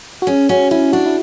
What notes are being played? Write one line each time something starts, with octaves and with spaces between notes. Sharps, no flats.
F#4
C#4 G#4
C#4 F#4
C#4 E4
D4 F#4
E4